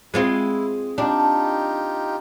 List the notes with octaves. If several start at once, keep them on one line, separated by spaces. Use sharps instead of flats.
G#3 C4 E4 F4
D4 D#4 F4 G4